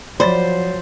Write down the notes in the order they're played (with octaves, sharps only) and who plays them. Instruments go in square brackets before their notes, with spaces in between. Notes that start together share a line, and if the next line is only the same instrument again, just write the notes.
[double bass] F3 [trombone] F#3 [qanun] C5 [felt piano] D5 B5 A6